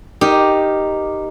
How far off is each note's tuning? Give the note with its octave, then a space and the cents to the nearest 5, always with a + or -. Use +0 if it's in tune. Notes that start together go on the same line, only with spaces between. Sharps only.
D#4 -5 G4 +0 A#4 +0